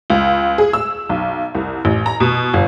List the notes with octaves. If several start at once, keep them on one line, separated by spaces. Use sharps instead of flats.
C#2
G#4
E6
B1
C2
A1
A#5
B2
G1